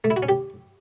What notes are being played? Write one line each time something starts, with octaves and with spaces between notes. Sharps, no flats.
A3
E4
F#4
C#4
G4